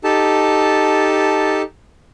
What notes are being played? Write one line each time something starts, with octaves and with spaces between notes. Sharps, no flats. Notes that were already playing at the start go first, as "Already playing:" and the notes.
D#4 G4 A4 A5